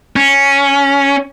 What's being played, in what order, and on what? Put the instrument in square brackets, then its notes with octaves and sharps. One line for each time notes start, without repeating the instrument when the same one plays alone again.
[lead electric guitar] C#4